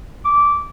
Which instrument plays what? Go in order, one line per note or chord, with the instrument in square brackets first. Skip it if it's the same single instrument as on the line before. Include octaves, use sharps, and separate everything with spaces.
[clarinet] D6